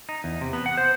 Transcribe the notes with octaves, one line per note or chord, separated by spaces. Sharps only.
D#4
E2
C3
B3
F#5
C5